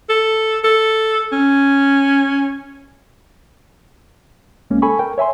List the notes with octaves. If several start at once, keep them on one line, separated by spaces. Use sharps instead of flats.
A4
A4
C#4
C2 G#3 A#3 C#4
A4 G#5 B5 C#6
A#4 G5
C#5 E5 G#5 C6